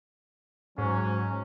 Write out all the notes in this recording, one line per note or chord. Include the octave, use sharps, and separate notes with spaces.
G#2 F#3 C#4